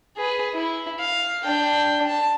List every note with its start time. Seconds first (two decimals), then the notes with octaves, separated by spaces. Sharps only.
0.17 G#4 B4
0.54 E4
0.99 F5
1.45 D4 G5
2.07 A5